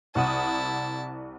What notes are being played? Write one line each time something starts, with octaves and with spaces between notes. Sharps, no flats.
C2 E4 F#5 A5 D#6